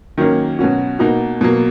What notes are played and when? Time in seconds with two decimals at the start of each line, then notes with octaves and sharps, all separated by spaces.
0.18 D#3 F#3 A#3 C#4
0.59 B2 F#3 C#4 F#4
0.99 B2 A#3 D#4 F#4
1.41 B2 F#3 A#3